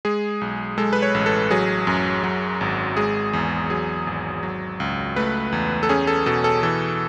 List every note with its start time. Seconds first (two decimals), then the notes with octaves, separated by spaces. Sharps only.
0.05 G#3 G#4
0.41 B1
0.78 G#3 A4
0.93 B4
1.02 C#5
1.14 A1
1.26 A4
1.51 F#3 G#4
1.87 F#2
2.24 F#3
2.61 G#1
2.97 G#3 G#4
3.33 E2
3.70 F#3 G#4
4.07 G#1
4.43 F#3
4.80 C#2
5.16 A3 B4
5.52 E2
5.83 A4
5.89 C#4 G#4
6.07 A4
6.26 B2 A4
6.44 A4
6.63 E3 A4